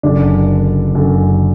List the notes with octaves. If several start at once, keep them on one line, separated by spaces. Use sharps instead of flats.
F#1 F#2 D3 D4
F#1 F#2 D3